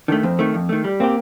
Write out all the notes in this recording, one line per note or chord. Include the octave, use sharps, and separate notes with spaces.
D#3 A3 D4
F2 C4
D#3 A3
F2
D#3 A3
G3
A#3 C4 G4